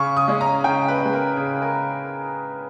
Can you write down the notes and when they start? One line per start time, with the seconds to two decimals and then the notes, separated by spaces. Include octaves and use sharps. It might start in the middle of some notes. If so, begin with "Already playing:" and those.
Already playing: C#3 C#6
0.17 D#6
0.28 G#3 C#4
0.41 A#5
0.64 C#3 G5
0.88 B4
1.01 G#3 C#4
1.13 A#4
1.37 C#3 G#4
1.62 A#4